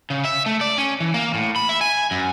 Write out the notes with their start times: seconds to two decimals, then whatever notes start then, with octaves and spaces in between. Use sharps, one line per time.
0.10 C#3
0.25 E5
0.46 A3
0.61 D5
0.78 C#4
1.00 E3
1.14 A#3
1.34 A2
1.56 B5
1.69 E5
1.81 G#5
2.11 F#2